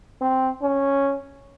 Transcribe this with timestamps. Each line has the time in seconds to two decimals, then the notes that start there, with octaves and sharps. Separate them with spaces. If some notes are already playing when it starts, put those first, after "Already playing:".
0.21 C4
0.62 C#4